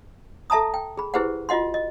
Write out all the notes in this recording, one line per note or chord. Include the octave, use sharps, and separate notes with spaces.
A4 E5 A5 A#5 D#6
G5
G#4 B5
E4 G4 G#4 B4 C5 F#5
F4 F#4 D#5 F#5 C6
D#5